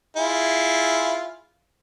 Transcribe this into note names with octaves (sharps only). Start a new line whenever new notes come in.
E4 F4 G#4